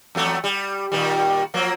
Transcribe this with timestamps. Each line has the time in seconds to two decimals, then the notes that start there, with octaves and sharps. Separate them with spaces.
0.15 E2 F#3 A3
0.44 G3
0.92 A#2 D#3 G3
1.54 F3 F#3 A#3